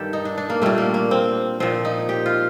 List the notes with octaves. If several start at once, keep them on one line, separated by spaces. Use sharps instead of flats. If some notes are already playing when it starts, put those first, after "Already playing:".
Already playing: G2 D#3 G3 G4 A4
D#4
D4
D4
A#3
A#2 G3 A3
A#3
A#3
C4
A#2 F3 C4
D#4
G4
F4